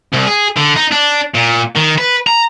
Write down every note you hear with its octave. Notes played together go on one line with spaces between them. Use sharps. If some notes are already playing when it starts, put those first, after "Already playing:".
C2
G#4
D3
D#4
D4
A#2
D#3
B4
A#5